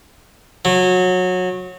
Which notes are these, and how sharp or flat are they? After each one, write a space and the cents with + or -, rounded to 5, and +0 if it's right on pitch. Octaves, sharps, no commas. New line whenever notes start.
F#3 -20